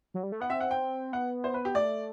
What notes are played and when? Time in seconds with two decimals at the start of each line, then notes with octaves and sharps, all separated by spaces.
0.14 F#3
0.23 G3
0.32 A3
0.40 B3 F#5
0.50 C4 E5
0.61 F#5
0.71 G5
1.12 B3 F#5
1.44 C5
1.54 B4
1.65 G4
1.75 A3 D5